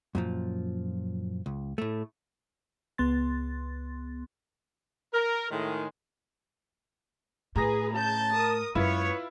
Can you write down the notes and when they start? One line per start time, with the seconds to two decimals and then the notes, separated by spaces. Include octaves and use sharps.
0.15 F#2 A#2 F3
1.46 C#2
1.78 A2 A3
2.98 C#2 B3 C6 A6
5.14 A#4
5.51 A2 D#3 G#3
7.56 A2 G#4 B4 A#5 A#6
7.93 C#3 A5 G6
8.33 A#4 D#6
8.75 F#2 G#3 B3 E4 F4 B4 C#5